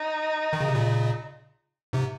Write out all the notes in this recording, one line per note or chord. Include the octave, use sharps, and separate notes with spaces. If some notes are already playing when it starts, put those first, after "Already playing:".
Already playing: D#4
D#3
C#3
C3
A#2 C#3
G#2 C3